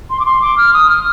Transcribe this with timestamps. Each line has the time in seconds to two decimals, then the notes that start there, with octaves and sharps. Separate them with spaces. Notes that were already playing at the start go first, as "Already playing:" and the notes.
0.10 C6
0.20 D6
0.26 C6
0.42 D6
0.58 F6
0.73 D#6
0.90 F6